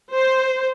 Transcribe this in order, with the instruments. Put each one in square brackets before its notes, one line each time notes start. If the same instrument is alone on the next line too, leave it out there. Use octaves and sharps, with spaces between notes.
[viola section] C5